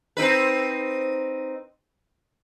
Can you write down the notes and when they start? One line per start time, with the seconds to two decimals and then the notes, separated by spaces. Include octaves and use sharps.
0.17 C4 D#4 B4